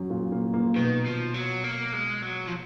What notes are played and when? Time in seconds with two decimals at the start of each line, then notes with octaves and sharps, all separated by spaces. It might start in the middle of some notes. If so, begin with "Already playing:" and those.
Already playing: F#2 F#3
0.10 A#2 A#3
0.32 A#2 A#3
0.54 A#2 A#3
0.75 B2 D#3 B3
1.06 F3
1.34 F#3
1.64 A#3
1.93 G#3
2.22 F#3
2.47 F3